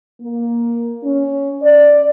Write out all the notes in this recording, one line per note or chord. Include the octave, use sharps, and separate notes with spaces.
A#3
C#4
D5